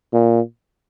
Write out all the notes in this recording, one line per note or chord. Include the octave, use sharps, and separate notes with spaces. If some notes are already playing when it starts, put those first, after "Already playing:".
A#2